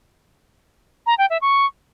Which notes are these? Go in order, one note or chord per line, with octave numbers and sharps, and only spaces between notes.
A#5
G5
E5
C#6